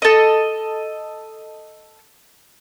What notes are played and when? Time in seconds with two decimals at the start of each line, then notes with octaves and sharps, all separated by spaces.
0.02 A4 D#5